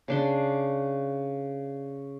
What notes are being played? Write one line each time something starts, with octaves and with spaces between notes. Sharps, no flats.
C#3 D4 C6